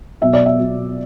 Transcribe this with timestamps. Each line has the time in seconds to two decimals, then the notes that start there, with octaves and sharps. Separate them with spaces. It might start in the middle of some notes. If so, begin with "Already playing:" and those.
0.21 B2 F#3 E5
0.33 D5
0.46 E5
0.59 B2 F#3